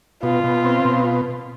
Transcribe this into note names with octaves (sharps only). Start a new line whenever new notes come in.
B2 F4
B2
C4
B2